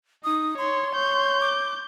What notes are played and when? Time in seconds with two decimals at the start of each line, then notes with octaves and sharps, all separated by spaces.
0.24 D#4 D#6
0.58 C#5 C6
0.96 C#5 G6
1.41 D6